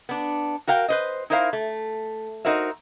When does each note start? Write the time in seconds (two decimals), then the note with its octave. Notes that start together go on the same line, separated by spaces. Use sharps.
0.09 B3 D4
0.67 F#4 A#4 F5 G5
0.88 B4 C5 D#5
1.30 D#4 E4 A#4 C5 E5 F5
1.53 A3
2.45 D#4 F#4 A#4 C5 E5